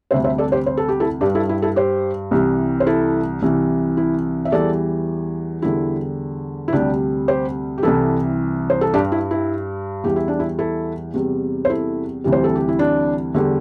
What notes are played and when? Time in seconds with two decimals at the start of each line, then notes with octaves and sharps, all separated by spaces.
0.11 D2 C3 G3 C5 E5
0.24 C5 E5
0.38 A4 D5
0.52 G4 C5
0.66 C5
0.77 A4
0.89 G4
1.00 E4 A4
1.21 G2 G3 D4 G4
1.35 E4 A4
1.49 E4
1.62 E4 A4
1.76 G4 C5
2.31 C2 C3 E3 G3
2.80 C5
2.87 E4 A4
3.42 C2 C3 E3
3.97 E4
4.45 E5
4.52 E2 E3 G3 A4 D5
5.62 E2 D3 G3 E4
6.68 E4
6.73 D2 C3 G3 D4 G4
7.28 G4 C5
7.78 G4
7.83 C2 C3 E3 G3 E4 A4
8.70 C5
8.81 A4
8.93 G2 G3 D4 G4
9.12 E4
9.31 E4
10.03 E2 E3 G3 G4
10.16 E4
10.28 D4
10.40 E4
10.59 E4 A4
11.14 E2 C3 G3
11.65 C5
11.70 E4 A4
12.24 D2 C3 E3 G3
12.32 C5
12.44 A4
12.56 G4
12.68 E4
12.79 D4
13.34 E2 D3 G3